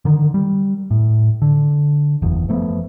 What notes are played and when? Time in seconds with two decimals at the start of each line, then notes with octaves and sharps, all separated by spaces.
0.05 D3 D#3
0.34 G3
0.91 A2
1.42 D3
2.22 F#1 E2
2.49 F3 A3 B3